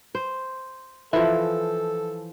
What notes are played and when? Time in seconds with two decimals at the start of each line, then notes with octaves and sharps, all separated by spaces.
0.15 C5
1.13 E3 F3 A4 E5